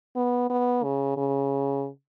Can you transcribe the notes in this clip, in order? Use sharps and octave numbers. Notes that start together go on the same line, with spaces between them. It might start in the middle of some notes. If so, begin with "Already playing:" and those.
B3
B3
C#3
C#3